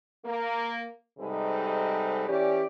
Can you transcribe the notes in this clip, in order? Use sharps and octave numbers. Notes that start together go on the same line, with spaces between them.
A#3
G#2 C3 G3 D#4 A4 B4
E3 C#4 G4 D5